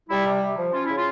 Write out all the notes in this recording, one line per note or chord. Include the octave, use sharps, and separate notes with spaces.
G3 E4
C3
C3
F3
C#4 F4
C#3 E4
F4